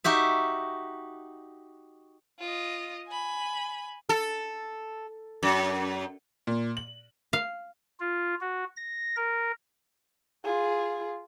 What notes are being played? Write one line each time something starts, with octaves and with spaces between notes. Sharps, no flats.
D#4 F#4 G4 E5
F4 D#5
G#5 B5
A4
F#2
A#2
F#7
F5
F4
F#4
A#6
A#4
F4 G#4